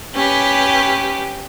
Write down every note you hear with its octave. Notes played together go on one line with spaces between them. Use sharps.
C#4 G4 B4